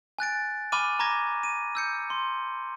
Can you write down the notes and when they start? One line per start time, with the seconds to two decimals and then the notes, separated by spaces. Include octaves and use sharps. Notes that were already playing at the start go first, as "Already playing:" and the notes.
0.19 G#5 F#6 A6 D7
0.72 G#5 B5 C#6 D6 F6 D#7
0.99 A#5 B5 C#6 D6 G#6 A#6
1.43 D#7
1.75 E6 G6 C#7
2.10 C6